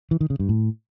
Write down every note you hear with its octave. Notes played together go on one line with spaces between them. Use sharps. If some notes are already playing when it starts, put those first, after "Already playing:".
E3
D#3
C#3
G2
A2